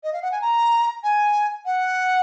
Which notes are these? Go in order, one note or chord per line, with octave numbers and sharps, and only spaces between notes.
D#5
F5
F#5
G#5
A#5
G#5
F#5